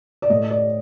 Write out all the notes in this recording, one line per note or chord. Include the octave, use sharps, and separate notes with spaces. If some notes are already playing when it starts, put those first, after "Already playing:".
D5
A2 A3 D#5
D5